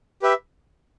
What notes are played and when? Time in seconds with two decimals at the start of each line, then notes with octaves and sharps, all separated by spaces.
0.22 G4 B4 E5